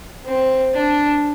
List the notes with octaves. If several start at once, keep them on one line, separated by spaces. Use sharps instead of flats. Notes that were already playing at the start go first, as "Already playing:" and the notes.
C4
D4